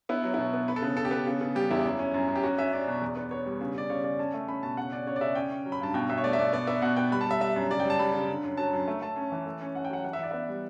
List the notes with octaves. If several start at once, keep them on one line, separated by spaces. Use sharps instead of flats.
B3 E4
F#3
B2 E4
B3
B3 B4
A4
C#3 B4
C#3 A4
G4
B3 A4
C#3
C#3
G3 G4
E2 E4
F#2
C#4
F#2
F#2
G4
C#4 F#4
C#4 E5
C#4 D5
B2
E2
B3
B3 C#5
G3
C#3
C#3 D5
C#3 C#5
C#3 D5
C#4 A5
A3
C#4 B5
B2 A5
C#3 F#5
C#4 D5
C#3 C#5
D5
C#3 E5
C#4 G5
C#4
F#3
B5
G2 A5
B2 G5
B2 E5
C#5
A3 D5
E5
B2 D5
B3 D5
B3 E5
B2 F#5
B3 G5
G3 B5
A5
G3 E5
G3 E5
F#2
C#3 D5
G5
G3 A5
G3 B5
C#3
D3
F#2
F#3 A5
F#2
A3
A3 A5
C#4
E3
A3
C#4
C#4 F#5
G5
F#3 F#5
E3 F#5
E5
E3 D5
B3 E5
G3